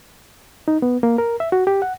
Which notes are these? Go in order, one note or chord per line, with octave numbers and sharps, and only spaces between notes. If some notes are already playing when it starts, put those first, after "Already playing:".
D#4
B3
A#3
A#4
E5
F#4
G4
F#5